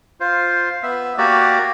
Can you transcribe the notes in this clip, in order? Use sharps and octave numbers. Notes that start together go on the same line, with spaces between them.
F4 C5
B3 E5
A#3 F#4 G4 D5